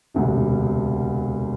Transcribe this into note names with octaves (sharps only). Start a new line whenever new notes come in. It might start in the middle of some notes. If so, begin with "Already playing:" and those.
E1 D2 C3